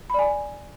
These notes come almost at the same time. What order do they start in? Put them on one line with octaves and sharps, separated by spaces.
B5 D5 G#5